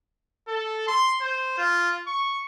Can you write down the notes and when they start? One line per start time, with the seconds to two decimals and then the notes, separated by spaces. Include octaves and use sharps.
0.48 A4
0.88 C6
1.21 C5
1.58 F4
2.07 C#6